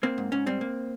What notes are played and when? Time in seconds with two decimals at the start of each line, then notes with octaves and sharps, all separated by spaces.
0.03 A#3 C4
0.18 G#2
0.32 G#2 C#4
0.46 G3 C4
0.61 A#3